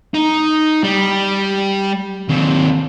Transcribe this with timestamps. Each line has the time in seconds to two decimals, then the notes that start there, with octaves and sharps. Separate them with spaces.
0.15 D#4
0.83 G3
2.28 D#2 C4